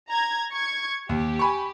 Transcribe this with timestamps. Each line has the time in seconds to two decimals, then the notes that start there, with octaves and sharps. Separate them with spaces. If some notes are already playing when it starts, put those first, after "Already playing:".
0.10 A#5 G#6
0.52 C#6 G#6 C#7
1.09 D#2 G4
1.39 G#5 B5 C#6